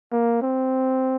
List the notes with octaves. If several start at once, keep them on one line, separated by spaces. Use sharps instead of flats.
A#3
C4